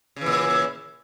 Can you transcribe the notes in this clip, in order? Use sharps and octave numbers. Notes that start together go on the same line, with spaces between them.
A#2 C#3 E3